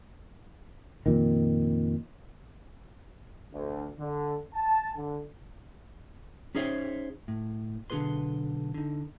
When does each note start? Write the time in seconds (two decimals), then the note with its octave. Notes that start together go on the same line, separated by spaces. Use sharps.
1.06 F2 A#2 D#3
3.53 D2
3.98 D3
4.54 A5
4.96 D3
6.55 C#4 D#4 G#4 C5 C#5 E5
7.28 A2
7.90 B1 D3 F#4 G#4 B4 C6
8.74 D3 D#4